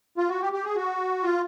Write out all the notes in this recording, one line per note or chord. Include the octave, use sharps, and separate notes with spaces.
F4
F#4
G4
G4
G#4
F#4
F4